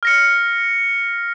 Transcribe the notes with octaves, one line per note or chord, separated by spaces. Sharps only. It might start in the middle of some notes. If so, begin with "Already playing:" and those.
F6 A#6 C#7